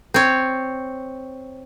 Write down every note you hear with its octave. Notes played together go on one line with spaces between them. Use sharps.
C4 C#5